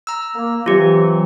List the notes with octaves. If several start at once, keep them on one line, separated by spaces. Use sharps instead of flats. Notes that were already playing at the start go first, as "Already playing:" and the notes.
A#5 E6
A#3
C3 E3 F#3 F4 G4